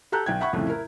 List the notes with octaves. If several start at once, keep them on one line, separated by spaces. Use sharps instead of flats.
G4 A4 A#5 F#6 G6
B1 G5 G#6
E5 F#5 B5 C#6
C2 F2 A2 C#3 A3
E4 A#4